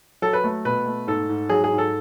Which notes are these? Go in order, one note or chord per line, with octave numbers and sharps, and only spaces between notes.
F#3 A4
B4
A3
B2 B4
A3
G#2 A4
G#2
F#3 G#4
G#4
G#2
A4